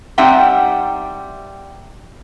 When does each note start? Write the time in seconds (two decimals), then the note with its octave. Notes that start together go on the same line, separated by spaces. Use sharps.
0.18 G3 C4 D#4 E5 F#5 G5